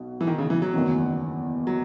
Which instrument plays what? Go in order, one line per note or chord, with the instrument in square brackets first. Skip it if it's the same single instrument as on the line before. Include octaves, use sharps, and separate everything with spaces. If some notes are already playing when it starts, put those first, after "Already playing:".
Already playing: [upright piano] B1 B2
[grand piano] E3
D#3
C#3
E3
F#3
[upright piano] F#1 E2 D#3 A3 C#4
[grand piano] F#3